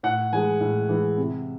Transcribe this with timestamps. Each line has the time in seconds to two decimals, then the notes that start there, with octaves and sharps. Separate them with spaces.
0.03 A2 F#5
0.32 E3 G#3 G#5
0.60 A2
0.89 E3 G#3
1.18 C3